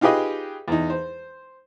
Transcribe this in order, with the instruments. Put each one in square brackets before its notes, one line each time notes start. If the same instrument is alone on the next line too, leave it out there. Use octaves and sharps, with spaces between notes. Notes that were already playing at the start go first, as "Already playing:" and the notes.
[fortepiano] D#4 F4 G4 G#4 B4 D#5
E2 D#4
C5